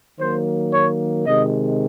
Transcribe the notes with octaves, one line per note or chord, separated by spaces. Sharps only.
D#3 F#3 A#3 C5
C#5
C3 D#3 G#3 D#5